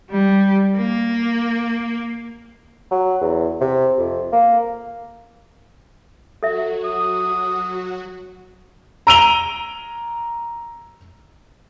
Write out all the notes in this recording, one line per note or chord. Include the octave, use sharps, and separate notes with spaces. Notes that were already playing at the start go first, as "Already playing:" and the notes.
G3
A#3
F#3
E2
C3
F2
A#3
F#3 F#4 A4 E5
D#6
A#5 E6 D7 D#7 F7 G7